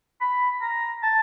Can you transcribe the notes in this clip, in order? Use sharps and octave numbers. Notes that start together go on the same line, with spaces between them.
B5
A#5
A5